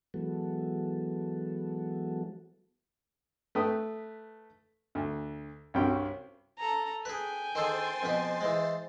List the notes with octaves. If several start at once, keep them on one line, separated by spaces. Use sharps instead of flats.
E3 F#3 G#3 B3 F#4 A4
A3 B4 G5 D#6
D2
C2 G2 C3 C#4 F#4 G5
A4 A#5
G#4 B4 G5 G#5
D#3 G#4 A4 C5 A6 C7
F2 B2 B3
E3 G#3